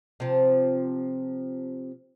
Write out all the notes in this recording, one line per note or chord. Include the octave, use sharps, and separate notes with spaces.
C3 F3